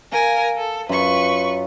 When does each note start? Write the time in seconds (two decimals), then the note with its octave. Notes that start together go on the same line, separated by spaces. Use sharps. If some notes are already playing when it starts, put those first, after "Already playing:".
0.12 A#4 F5 G#5
0.57 A4
0.89 F#2 F4 B4 C#6